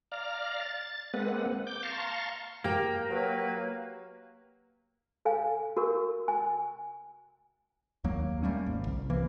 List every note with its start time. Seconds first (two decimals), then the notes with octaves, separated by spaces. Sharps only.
0.12 D5 F5 A#5 F6
0.60 A6
1.14 G#3 A#3 C4 B4 F#5
1.67 D6 G6
1.83 F5 A5 A#5 C6 C#6
2.64 A#3 G4 G5
3.10 F#3 B4
5.25 A4 F5 G#5
5.77 F#4 A#4 C#6
6.28 G#5
8.04 D#2 F#3 A#3
8.43 G3 A3 A#3 C#4
8.66 G#1
8.86 C2
9.10 E3 A#3